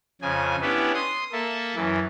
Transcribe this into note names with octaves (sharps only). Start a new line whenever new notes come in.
F2 C#3 G#5
B3 C#4 D4 E4 G4 B4
C6 D#6
A#3 A4 E5
F#2 E3